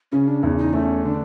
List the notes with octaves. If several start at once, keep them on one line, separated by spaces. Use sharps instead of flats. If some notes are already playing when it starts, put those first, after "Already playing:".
C#3 C#4
D4
E2 D#4
D#4
A3 C#4
D3 D4